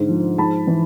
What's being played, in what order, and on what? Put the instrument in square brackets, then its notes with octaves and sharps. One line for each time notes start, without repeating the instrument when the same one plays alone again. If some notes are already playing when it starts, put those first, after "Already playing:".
Already playing: [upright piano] G#2 D3
F3
G#2 A5 B5
E3